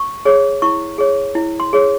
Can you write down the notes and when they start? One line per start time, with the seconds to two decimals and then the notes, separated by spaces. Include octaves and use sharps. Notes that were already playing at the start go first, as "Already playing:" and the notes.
Already playing: C#6
0.25 G#4 C#5
0.62 E4 C#6
0.98 G#4 C#5
1.35 E4
1.60 C6
1.73 G#4 C#5